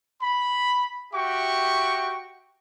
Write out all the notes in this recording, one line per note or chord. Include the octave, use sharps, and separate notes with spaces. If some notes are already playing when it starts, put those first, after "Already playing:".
B5
F#4 G4 E5 G5 C#6